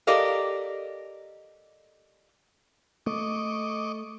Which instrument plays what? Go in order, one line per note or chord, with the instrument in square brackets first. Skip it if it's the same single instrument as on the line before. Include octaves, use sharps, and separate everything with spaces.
[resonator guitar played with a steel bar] G4 A4 A#4 D5 D#5 F5
[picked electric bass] A3 [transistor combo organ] D#5 C#6 D6